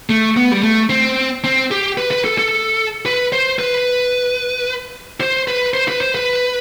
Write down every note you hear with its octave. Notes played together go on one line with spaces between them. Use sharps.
A3
B3
G3
A3
C4
C4
G4
B4
B4
A4
A4
B4
C5
B4
C5
B4
C5
B4
C5
B4